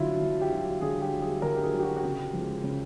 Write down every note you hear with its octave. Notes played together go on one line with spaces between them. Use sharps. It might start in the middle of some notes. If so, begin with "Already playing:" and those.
Already playing: D3 F#3 E4 F4
D3
G4
F#3
D3 G#4
G4
F#3
G#4
D3 A#4
G4
G#4
F#3
G4
F#4
F#4
C#3 G4
F3 G#3
C#3